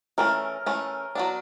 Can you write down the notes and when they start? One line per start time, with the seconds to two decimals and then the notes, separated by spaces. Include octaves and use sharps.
0.18 E3 A3 C#4 A#4
0.66 E3 A3 C#4
1.15 F#3 B3 D4